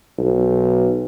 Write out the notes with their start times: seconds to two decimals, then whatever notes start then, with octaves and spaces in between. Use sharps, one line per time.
0.18 B1